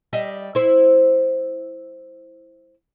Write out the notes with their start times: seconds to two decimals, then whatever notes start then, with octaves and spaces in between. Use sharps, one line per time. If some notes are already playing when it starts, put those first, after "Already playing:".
0.13 G3 D#5 E5
0.55 E4 C5